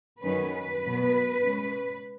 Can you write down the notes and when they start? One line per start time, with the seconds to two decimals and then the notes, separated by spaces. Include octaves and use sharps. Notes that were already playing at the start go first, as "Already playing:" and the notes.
0.24 F#2 D#3 F#3 C#4 B4
0.54 B4
0.84 B2 F#3 B3
1.44 C#3 G#3 C#4